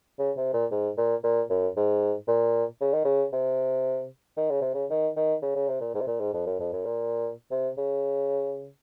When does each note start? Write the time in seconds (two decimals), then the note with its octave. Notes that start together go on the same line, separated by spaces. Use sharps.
0.19 C#3
0.37 C3
0.54 A#2
0.71 G#2
0.98 A#2
1.24 A#2
1.50 F#2
1.77 G#2
2.28 A#2
2.81 C#3
2.93 D#3
3.05 C#3
3.33 C3
4.37 D#3
4.50 C#3
4.62 C3
4.74 C#3
4.91 D#3
5.17 D#3
5.42 C#3
5.56 C#3
5.68 C3
5.81 A#2
5.95 G#2
6.01 C3
6.07 A#2
6.20 G#2
6.34 F2
6.47 F#2
6.60 F2
6.73 F#2
6.85 A#2
7.51 C3
7.78 C#3